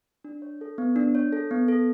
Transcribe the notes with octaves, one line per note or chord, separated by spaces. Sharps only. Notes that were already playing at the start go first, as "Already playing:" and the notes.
D4
C#5
A4
B3
D4
C#5
A4
B3
A4